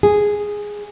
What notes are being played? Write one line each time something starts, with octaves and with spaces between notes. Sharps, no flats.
G#4